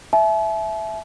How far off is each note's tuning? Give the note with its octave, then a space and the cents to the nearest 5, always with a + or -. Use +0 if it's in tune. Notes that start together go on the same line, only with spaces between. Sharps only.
E5 +0 A5 -45